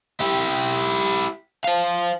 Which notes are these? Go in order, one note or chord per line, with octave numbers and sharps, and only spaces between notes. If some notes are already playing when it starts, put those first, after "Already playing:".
E4 G4
C5 F5